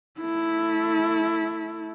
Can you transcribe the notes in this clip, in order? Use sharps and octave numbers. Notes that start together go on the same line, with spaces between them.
A3 E4